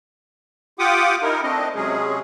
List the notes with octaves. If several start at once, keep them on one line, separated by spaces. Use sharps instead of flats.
F4 G4 F#5 G5 D6 D#6
D#4 E4 A#4
A3 C4 D4 D#5
C3 F#3 G#3 C#4 G#4